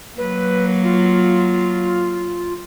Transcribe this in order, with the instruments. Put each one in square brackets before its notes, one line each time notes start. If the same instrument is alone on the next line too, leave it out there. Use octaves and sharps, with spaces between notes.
[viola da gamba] F#3 A#3 [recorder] B4
[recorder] F4